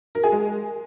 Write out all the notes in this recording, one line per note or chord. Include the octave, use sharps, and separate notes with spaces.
A#4
G#4
G#3